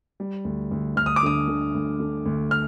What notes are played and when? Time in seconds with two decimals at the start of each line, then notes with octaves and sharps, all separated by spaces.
0.20 G3
0.45 D2
0.71 D2
0.96 D2 F6
1.06 D#6
1.16 D6
1.23 D3 D#6
1.48 D3
1.74 D2
2.00 D3
2.26 D2
2.51 F6